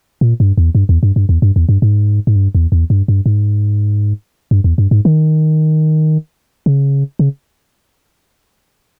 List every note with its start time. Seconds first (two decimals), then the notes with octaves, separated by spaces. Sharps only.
0.21 A#2
0.40 G2
0.57 E2
0.75 G2
0.89 E2
1.03 G2
1.16 G2
1.29 E2
1.42 G2
1.56 E2
1.69 G2
1.82 G#2
2.27 G#2
2.36 G2
2.55 E2
2.72 E2
2.90 G2
3.08 G2
3.26 G#2
4.51 G2
4.64 E2
4.78 G2
4.91 G#2
5.05 D#3
6.66 C#3
7.19 C#3